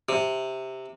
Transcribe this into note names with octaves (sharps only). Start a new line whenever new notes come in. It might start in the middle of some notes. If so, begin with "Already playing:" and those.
C3